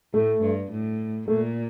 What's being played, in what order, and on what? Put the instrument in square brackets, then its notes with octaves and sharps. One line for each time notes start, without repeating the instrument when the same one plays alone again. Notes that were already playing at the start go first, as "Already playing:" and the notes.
[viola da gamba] A2 [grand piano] A3
[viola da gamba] G2
A2
[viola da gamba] A#2 [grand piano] A3